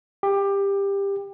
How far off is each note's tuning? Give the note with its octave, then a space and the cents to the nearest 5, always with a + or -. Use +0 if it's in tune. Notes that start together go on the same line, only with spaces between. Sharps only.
G4 +20